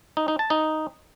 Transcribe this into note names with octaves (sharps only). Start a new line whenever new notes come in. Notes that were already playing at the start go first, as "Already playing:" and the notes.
D#4
D#4
A5
D#4